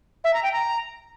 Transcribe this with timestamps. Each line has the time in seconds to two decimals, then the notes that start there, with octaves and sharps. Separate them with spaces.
0.24 E5
0.34 A#5
0.43 G5
0.53 A#5